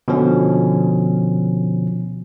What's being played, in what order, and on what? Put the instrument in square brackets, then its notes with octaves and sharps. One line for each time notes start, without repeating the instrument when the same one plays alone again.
[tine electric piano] B2 D3 F3 C#4